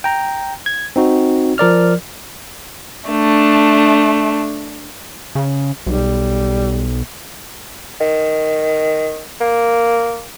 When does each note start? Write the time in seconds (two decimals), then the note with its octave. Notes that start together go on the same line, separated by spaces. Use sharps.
0.04 G5 A#5
0.66 G#6
0.96 C4 D#4 F#4
1.58 F3 A#4 D5 F6
3.09 A3 D4
5.35 C#3
5.86 B1 G3
8.01 D#3
9.40 A#3